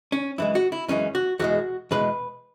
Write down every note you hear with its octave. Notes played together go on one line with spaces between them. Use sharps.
C#4
F#2 E3 G#3 E4
F#4
E4
F#2 E3 G#3 C#4
F#4
E2 B2 G#3 F#4
E2 B2 G#3 B4